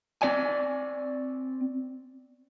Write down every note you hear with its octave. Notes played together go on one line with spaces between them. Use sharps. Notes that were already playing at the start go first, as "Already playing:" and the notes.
C4 D5 G#5